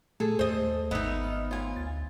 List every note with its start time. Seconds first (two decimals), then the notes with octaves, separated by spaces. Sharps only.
0.20 A#2 A3 G#4 A4
0.39 D#2 C5 D#5
0.91 G#1 B3 D#4 D#5 E5 B5
1.24 F6
1.51 G#1 F4 C#5 G#5 B5
1.76 D2 A6